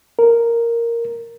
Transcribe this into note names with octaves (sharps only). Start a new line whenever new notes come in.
A#4